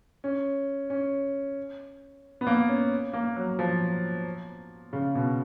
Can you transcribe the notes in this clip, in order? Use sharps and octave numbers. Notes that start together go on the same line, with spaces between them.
C#4
C#4
B3
A#3
C#4
A#3
F#3
F3
C#3
B2